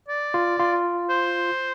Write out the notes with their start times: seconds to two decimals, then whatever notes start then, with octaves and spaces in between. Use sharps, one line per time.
0.08 D5
0.34 F4
0.59 F4
1.10 C5